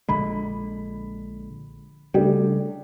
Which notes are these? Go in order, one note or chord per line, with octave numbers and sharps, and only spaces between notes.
A#1 D3 G#3 B5
C#3 G3 A3 D4 G4